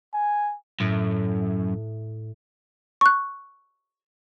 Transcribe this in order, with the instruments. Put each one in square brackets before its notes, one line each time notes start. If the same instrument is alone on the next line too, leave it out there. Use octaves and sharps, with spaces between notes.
[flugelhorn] G#5
[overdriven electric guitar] F#2 [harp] A2
[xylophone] C#6 F#6